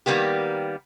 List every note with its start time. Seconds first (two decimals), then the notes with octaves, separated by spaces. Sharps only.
0.06 D#3 G3 A#3 B3 G4